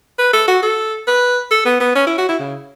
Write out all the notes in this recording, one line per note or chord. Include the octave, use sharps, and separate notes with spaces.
B4
A4
F#4
A4
B4
A4
B3
B3
C#4
E4
F#4
E4
C#3